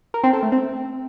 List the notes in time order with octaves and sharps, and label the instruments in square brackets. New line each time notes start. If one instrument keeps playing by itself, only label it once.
[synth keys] A#4
C4
A4
A3
C4